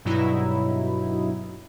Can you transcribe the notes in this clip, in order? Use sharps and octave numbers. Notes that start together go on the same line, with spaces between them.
G2 B2 F#3 D#4 E4